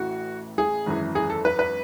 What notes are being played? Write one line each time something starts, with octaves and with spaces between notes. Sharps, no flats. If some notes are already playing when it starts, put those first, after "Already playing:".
Already playing: A1 A2 E3 F#4
G#4
G#1 F#2 E3
G#4
A4
B4
B4